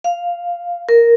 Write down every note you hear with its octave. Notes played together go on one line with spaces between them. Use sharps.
F5
A#4